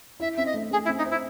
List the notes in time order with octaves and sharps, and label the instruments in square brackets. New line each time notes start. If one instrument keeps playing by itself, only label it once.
[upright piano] E4 [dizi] E5
[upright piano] C4 [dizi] E5
[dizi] D#5
[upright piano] A3
[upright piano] A3 [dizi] G#4
[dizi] E4
[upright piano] C4
[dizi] D#4
[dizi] E4 [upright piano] C5